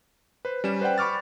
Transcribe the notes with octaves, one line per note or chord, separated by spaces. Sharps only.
B4 C5
G3 C#4 E7
B4 C5 D5 F#5 G5
B5 C#6 D6 F6 A6